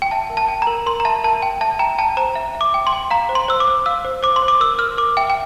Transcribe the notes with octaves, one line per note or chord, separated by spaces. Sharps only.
G5
E5 A5
A#4
A5
G5
A#5
A#4
A#4 C6
A#5
E5 A5
A#4 A5
G5
E5 A5
G5 A#5
G5 A5
C5 A#5
E5
E5
D6
G5
C6
G5
F5 A#5
C5
C6
C5 E6
D6
C5
F5 E6
C5
C5 D6
C6
C5
D6
A#4 E6
A#4 F6
A#4 D6
E5 G5
G5